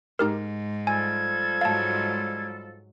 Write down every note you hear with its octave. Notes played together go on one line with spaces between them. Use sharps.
G#2 D#4 G4 A#4
F3 G3 A4 G#5 G#6
G#2 F#3 G#3 F5 A5